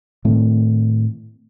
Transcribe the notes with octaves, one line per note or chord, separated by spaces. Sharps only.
A2 D#3 A3 C4